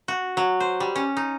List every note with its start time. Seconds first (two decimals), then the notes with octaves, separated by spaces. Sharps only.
0.08 F#4
0.37 F#3
0.60 C5
0.80 G3
0.96 C#4
1.17 D#4